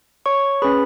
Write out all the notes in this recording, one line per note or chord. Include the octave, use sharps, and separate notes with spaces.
C#5 C#6
C#4 G#4 B4 B5